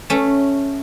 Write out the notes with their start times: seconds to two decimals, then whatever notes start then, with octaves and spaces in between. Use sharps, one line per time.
0.10 A3 C#4